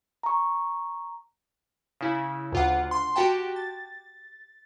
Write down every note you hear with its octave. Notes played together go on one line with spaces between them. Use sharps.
A#5 C#6
C#3 E4
D2 F4 F#5
C6
F#4 G4 G5 A5
A6